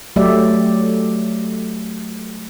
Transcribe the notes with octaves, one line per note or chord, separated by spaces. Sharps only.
F#3 A3 G4 D5 E5